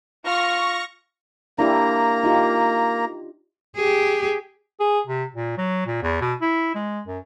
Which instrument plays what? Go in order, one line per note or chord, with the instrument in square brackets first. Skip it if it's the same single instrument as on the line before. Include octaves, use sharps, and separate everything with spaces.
[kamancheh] F4 F6 [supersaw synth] C#6 A#6
[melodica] A#3 A#5 [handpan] D4 E4 G4
[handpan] D#4 F4 G4
[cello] G4 G#4
[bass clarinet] G#4
C3
A#2
F#3
A#2
E2
B2
E4
G#3
F#2